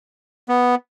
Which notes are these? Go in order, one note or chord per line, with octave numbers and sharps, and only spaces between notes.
B3